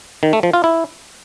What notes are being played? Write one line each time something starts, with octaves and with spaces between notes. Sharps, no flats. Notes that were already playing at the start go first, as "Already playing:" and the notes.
D#3
A3
F3
F4
E4